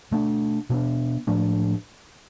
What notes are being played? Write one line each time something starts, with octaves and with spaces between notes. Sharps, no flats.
B2 A3 D4
B2 B3 D4
A2 F3 A3 D4